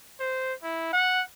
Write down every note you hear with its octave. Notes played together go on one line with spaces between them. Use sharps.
C5
E4
F#5